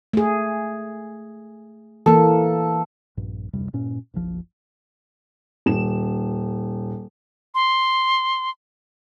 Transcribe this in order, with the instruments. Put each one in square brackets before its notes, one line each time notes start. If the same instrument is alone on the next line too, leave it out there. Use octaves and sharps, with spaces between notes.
[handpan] A3 G#4
[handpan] E3 A#3 [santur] A4
[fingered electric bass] A#1 G2 A#2
D1 F2 C3 G3
G2 A#2 C#4
F#1 B1 F3
[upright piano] D#1 E7
[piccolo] C6